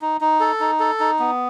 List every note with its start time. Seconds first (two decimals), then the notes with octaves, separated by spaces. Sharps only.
0.02 D#4
0.21 D#4
0.40 A4
0.60 D#4
0.80 A4
1.00 D#4
1.19 B3